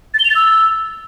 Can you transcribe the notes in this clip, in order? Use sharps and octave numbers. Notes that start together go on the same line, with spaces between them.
A6
G7
F7
A6
E6